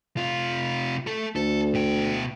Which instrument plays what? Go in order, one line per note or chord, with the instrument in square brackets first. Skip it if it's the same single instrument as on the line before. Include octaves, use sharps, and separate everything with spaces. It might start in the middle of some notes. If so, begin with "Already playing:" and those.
[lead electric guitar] C3 F4
A3 A4
[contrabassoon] D2 [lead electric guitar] A4
[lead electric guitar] B2 G5